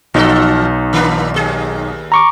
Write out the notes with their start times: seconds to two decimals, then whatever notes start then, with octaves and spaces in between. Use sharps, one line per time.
0.14 B1 E3 D#4 F#4 A4
0.93 D#3 A#3 D4
1.34 D#2 G#4
2.12 A#5 C#6 D6